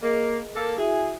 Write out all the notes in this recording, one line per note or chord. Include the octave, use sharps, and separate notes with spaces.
A#3 G#4 A#4 D#5
A#3 A4
E4 F#4 G#4 E5